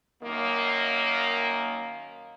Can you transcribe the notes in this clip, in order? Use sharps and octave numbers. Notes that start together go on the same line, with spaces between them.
F#2 D#3 A#3